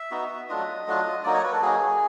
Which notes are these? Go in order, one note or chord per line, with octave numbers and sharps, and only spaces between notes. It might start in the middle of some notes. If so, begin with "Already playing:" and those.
Already playing: E5
B3 D#4 F#4
F#3 A3 D4 F4 D#5
F#3 A3 D4 F4
F#3 A#3 D#4 F#4 D5
C#5
B4
A4
F#3 A#3 D#4 F#4 G#4